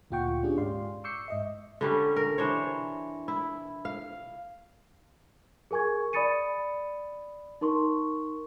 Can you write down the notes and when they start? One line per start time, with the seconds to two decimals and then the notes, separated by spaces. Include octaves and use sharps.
0.10 D2 A#2 F4 F#5 G5 C#6
0.43 C#4 D4 G4 G#4
0.57 G#2 D5 F5 C6
1.04 C#6 D6 E6 G6 C7 C#7
1.28 G#2 D#5 E5
1.81 D3 G3 C#4
2.16 A#4
2.38 E3 D4 C5 C#5
3.28 E4
3.85 F5
5.71 G#4 A#4 G#5 C#6 G#6
6.13 D5 B5 D#6 A6 C#7 D#7
7.61 D#4 A#4 C6 C#6